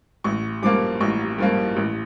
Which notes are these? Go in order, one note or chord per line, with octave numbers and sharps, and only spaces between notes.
A1 C#6
G2 F3 A#3 D6
A1 C#6
G2 F3 A#3
A1